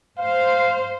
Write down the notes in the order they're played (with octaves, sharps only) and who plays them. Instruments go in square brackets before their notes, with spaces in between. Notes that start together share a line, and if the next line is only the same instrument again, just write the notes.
[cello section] C5 [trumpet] F5